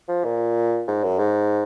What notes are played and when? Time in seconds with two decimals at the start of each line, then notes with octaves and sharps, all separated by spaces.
0.08 F3
0.24 A#2
0.87 G#2
1.04 F#2
1.18 G#2